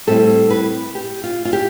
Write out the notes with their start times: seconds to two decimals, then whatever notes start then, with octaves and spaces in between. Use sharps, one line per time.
0.07 A2 G3 C4 E4 A4
0.50 B4
0.95 G4
1.24 F4
1.45 F4
1.53 G4